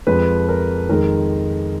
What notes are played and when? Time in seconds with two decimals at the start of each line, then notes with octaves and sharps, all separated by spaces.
0.07 F2 F3 G#3 B4
0.49 A#4
0.89 F2 D#3 G#3 A#4